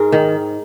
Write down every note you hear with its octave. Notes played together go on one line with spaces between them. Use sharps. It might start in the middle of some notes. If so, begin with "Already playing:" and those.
Already playing: G#2 G#3 A#4
D#3